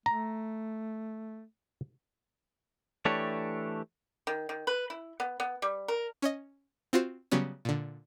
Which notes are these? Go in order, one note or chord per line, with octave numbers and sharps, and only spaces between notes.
A3 A#5
E3 A3 D4 G4 C#5
D#3
D#3
B4
E4
B3
B3
G3
A#4
C#4 C#5 D#5
C4 F4 F#4 C5
C#3 F#3 G3 B3 C#4
A#2 D3